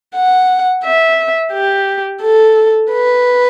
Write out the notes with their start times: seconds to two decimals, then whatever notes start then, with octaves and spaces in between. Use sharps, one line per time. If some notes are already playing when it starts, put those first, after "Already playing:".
0.15 F#5
0.84 E5
1.52 G4
2.22 A4
2.91 B4